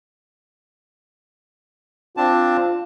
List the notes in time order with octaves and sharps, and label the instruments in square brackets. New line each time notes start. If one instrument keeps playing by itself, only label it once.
[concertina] C4 D4 A5 [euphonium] F4